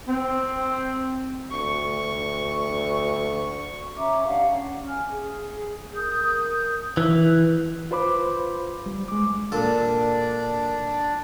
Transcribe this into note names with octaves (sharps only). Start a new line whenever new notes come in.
C4
D2 C#6
C#4 E5 A#5 D6
D4 G4 F5 F#5
C#4
G#5 F6
G#4
A#4 D#6 G6
E3
F4 B4 C5 B5 D6
G3
G#3 D6
A#2 D4 A4